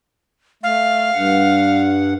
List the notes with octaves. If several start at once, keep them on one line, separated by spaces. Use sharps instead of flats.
A3 F5
G2 F#5